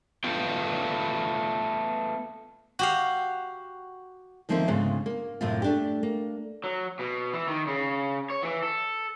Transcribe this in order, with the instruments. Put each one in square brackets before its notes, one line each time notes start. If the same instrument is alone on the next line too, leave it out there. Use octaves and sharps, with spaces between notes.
[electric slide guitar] A3 B3 F4 G5
[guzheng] F#4 G4 F5
[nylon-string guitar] D2 D#3 F3 A#3 C4 E5
D2 G#2 C#3 B3 F4
A#3
F#2 A2 C3 E4 F4
A3 D4 G4
A#3
[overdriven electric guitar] F#3
B2
E3
D#3
C#3
C#5
E3
A4